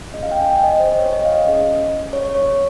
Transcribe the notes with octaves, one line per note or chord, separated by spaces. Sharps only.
C#4 F4 G#4 D#5
F5
G5
G#5
G5
D#5
C5
C#5
D#5
F5
D#5
C#4 G#4
C#5
C#5
C#5
C#5